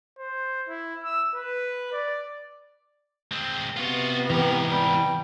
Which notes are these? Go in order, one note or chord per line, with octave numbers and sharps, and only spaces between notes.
C5
E4
E6
B4
D5
G#3 C4
C3 B3 F4 F#4
G#2 E3 G4 A#4
G3 G5